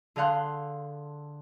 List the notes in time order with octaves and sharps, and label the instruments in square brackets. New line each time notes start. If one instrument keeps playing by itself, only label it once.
[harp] D3 G#4 F5 F#5 C6